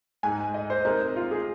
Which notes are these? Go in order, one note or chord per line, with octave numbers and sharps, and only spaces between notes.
G#2 G#3 D#4 G#5
D#5
C5
C3 G#3 D#4 A#4 C5 D#5
A#4
F4
G#4